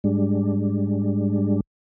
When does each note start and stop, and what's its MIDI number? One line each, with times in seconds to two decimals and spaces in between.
0.04 1.60 44
0.04 1.60 55
0.04 1.60 56
0.04 1.60 62